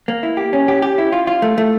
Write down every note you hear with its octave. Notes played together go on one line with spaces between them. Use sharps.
A#3
E4
G4
C#4
G4
G4
E4
F4
F4
A3
A3